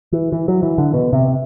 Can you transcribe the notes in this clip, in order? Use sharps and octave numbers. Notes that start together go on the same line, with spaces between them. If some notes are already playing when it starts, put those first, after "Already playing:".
E3
E3
F#3
E3
D3
B2
C3